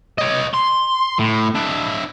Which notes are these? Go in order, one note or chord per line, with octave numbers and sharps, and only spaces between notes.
C#5 D#5
C6
A2
D4 E4